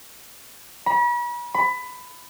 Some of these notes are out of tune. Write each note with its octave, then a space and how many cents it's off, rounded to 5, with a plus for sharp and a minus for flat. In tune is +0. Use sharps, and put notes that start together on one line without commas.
B5 -40
B5 +20